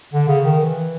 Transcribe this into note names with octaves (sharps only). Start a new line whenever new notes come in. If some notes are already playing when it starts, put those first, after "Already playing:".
D3
C#3
D#3
E3